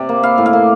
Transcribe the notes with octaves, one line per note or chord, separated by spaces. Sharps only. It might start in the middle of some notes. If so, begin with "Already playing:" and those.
Already playing: C3 D5
A#3
E4 F5
A2
F5
A#3